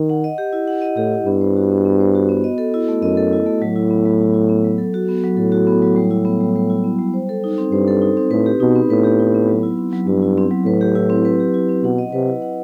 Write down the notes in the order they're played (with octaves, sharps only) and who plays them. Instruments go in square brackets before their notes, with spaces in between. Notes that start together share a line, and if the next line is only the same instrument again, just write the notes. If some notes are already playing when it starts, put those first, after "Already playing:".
Already playing: [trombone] D#3
[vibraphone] F#5
D#5
G4
E4
F#5
D#5
[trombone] A2 [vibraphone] G4
[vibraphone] E4
[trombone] G2 [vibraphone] B3
[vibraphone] C5
F#4
B3
B3
C5
F#4
B3
D#5
A4
E4
A3
[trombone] F#2 [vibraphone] D#5
[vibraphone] A4
E4
A3
[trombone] A2 [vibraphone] F#3
[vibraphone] E4
B3
F#3
F#3
E4
B3
F#3
A4
F#4
B3
F#3
[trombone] A2 [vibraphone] A4
[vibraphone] F#4
B3
F#3
G3
E4
B3
G3
G3
E4
B3
G3
C5
A4
D#4
C4
[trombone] G2 [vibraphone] C5
[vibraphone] A4
D#4
C4
[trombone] A2 [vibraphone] B4
[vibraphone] G4
[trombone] B2 [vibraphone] D#4
[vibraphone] B3
[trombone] A2 [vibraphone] B4
[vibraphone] G4
D#4
B3
F#3
E4
C4
F#3
[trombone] G2 [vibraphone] F#3
[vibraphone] E4
C4
F#3
[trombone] A2 [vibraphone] B4
[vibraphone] G4
E4
C4
B4
G4
E4
C4
[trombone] B2 [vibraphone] F#5
[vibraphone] D#5
[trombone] C3 [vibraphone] B4
[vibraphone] E4
F#5